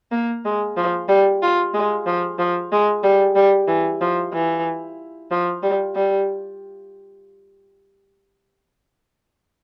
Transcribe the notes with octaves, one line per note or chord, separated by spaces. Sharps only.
A#3
G#3
F3
G3
F4
G#3
F3
F3
G#3
G3
G3
E3
F3
E3
F3
G3
G3